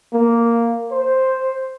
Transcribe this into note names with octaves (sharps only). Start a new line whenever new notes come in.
A#3
C5